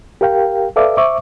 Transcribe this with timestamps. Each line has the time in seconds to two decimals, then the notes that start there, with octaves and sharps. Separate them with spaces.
0.21 G4 A#4 F5 G5
0.76 A4 B4 D5 E5 F5 D6
0.97 C5 E5 C#6 D6